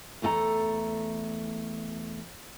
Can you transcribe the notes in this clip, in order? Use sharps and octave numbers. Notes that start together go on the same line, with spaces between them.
E2 A3 A4 F#5 A#5